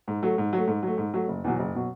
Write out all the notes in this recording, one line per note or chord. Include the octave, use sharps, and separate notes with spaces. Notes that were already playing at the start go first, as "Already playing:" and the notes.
G#2
F#3 A3
G#2
F#3 A3
G#2
F#3 A3
G#2
F#3 A3
F#1
E2 B2 F#3
F#1
B2 F#3